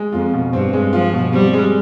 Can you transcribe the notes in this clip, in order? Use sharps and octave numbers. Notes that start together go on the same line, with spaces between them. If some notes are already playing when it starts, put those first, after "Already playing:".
Already playing: G#3
F2 F4
B2
G2 C4
G#3
F3 F4
B2
G3 C4
G#3